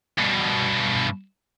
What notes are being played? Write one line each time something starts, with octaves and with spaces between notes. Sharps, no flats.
G2 B2